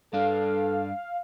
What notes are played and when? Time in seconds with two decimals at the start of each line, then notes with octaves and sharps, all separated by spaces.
0.13 G2 D4 A4 F5